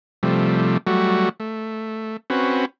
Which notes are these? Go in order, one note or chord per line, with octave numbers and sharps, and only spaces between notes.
C3 F3 G3 A3
F#3 G3 A3 F#4
A3
C4 C#4 F#4 B4